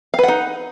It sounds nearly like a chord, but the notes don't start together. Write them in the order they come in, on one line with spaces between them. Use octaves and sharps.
F5 B4 F#5 D#4